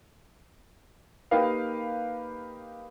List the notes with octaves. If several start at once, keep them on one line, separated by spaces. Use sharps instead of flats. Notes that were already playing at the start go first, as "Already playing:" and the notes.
A#3 D#4 G4 A#4 B4 F5